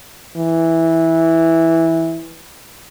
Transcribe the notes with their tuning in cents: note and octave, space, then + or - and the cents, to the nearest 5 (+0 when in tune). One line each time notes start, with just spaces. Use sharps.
E3 -10